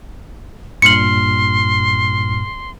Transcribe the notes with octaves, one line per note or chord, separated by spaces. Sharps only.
G2 A#2 C6 F6 C#7 F#7